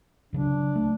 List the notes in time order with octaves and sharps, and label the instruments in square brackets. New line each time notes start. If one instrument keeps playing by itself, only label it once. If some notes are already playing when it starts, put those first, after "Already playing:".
[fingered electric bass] C#2 C#3 F#3 [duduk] D4
[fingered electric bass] A3